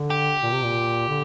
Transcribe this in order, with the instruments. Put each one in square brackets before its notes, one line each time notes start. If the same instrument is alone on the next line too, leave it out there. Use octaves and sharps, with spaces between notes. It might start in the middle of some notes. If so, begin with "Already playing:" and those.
Already playing: [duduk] D3
[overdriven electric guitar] G4
[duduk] A#2
C3
A#2
D3